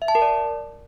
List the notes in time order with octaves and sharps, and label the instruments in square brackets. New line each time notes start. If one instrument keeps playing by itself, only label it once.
[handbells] E5
A5
A#4
D5